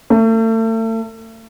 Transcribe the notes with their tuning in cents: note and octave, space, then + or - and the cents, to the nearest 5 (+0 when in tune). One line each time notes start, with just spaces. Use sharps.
A3 +35